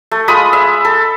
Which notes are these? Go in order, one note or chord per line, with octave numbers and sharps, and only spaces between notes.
A3
G#3 F4 B5 D#6
E5
A4